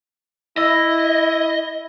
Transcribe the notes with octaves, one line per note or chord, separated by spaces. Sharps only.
E4 D#5 E6 A#6